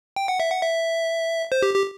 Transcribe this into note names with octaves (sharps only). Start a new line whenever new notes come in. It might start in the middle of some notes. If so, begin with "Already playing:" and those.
G5
F#5
E5
F#5
E5
C5
G4
G4